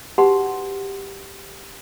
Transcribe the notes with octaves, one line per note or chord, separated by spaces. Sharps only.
D#4 F#4 G4 B4 F#5 C6